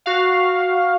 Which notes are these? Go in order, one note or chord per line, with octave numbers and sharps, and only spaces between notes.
F#4 F5